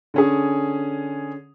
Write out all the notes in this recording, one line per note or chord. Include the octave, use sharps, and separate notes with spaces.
D3 C#4 G#4